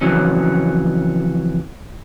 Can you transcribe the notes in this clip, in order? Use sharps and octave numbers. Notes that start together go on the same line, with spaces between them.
F2 C#3 E3 F#3 C#4